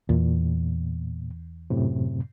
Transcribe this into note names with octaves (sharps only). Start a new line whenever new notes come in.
E2 A#2
F#2 A2 C3